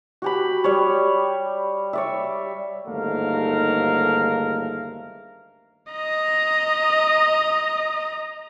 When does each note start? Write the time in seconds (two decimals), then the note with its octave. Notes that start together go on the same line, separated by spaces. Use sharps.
0.22 F#4 G4 B5
0.64 G3 C#5
1.93 C#5 D5 E5
2.87 G1 D#2 G#2 A3 A#4 F5
5.92 D#5 A#5